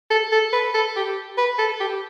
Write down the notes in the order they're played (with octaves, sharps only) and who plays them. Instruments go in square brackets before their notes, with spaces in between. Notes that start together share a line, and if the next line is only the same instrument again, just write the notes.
[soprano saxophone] A4
A4
B4
A4
G4
B4
A4
G4